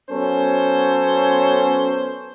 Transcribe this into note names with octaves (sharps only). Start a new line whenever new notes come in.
F#3 B3 C#4 A4 C5 C#5